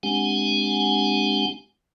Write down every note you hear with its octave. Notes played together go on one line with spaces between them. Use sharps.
G#3 C4 D4 G4 F#5 G#5